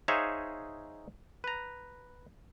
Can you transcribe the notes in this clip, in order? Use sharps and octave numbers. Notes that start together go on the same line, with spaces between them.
D#4 G#4 C5 C#5 E5 F5
B4 A#5